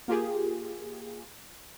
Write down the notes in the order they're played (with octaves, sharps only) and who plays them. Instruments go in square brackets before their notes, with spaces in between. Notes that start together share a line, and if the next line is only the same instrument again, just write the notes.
[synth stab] A#3 F4 G4 G#4